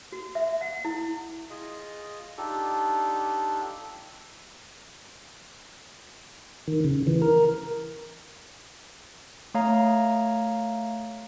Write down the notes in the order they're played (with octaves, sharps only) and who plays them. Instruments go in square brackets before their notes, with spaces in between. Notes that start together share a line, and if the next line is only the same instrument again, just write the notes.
[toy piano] F#4
E5
F#5
E4
[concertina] F4 G#4 D#5
D4 D#4 F4 G4 A4
[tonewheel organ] D#3
C#3
E3
A#4
[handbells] A3 C#5 F5 A#5